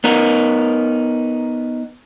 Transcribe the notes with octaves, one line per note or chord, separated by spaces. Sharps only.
B3 D#4 A#4